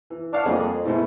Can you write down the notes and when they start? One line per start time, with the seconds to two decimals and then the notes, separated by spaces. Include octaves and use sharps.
0.10 E3
0.33 D4 C#5 F5 F#5
0.45 F2 G3 A#3 G#4
0.85 G#2 B2 A3 E4